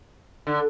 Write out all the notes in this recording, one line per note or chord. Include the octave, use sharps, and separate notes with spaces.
D3